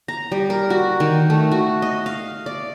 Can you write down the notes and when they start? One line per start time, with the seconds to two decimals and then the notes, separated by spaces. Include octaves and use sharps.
0.08 A#5
0.32 G3
0.50 A#4
0.70 F#4
1.00 D#3
1.30 A3
1.52 F#4
1.82 D#5
2.06 F5
2.46 D5